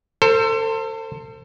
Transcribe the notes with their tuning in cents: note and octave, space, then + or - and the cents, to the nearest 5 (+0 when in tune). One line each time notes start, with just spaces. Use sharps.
A4 +35 C5 +0